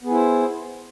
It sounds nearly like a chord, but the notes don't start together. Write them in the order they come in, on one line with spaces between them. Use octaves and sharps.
B3 G#4 E4 C5